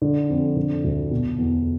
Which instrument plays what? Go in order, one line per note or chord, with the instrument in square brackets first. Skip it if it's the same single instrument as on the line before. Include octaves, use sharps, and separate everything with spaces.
[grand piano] D3
F2
D3
D2
B2
E2